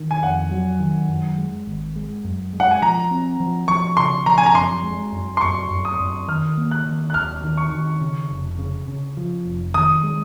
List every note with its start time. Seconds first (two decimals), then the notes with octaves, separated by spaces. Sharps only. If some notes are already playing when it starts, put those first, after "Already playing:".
Already playing: D#3
0.11 G#5
0.23 F2 F#5
0.51 F#3
0.80 D#3
1.09 F#2
1.38 G#3
1.67 G#1
1.96 G#3
2.24 F#2
2.53 G#3
2.60 F#5
2.71 G#5
2.82 F3 A#5
3.11 C4
3.40 F3
3.68 F3 C#6
3.97 C#3 C6
4.26 F3 A#5
4.38 G#5
4.46 A#5
4.55 F#2 C6
4.84 G#3
5.12 F#2
5.37 C6
5.41 F#2 C#6
5.71 F#2
5.85 D#6
6.00 F#2
6.28 D#3 F6
6.57 A#3
6.71 F#6
6.86 D#3
7.10 F#6
7.14 D#2 F6
7.44 D#3
7.57 C#6
7.72 D#3
8.01 C#3
8.31 F1
8.59 C#3
8.88 C#3
9.17 F3
9.45 F1
9.74 D#3 D#6
10.03 G#3